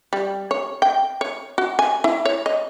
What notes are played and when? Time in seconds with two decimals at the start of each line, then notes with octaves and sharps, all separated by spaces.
0.13 G3
0.51 C#5
0.82 G5
1.21 C#5
1.58 F#4
1.79 G#5
2.04 E4
2.25 C#5
2.46 D#5